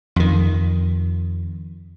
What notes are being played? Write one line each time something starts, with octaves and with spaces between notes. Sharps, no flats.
F2 D#3